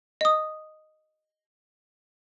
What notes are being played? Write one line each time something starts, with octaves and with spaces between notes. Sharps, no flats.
D#5 D#6